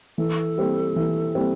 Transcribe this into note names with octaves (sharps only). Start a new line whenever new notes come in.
E3 A4
G3 C4
E3
G3 C4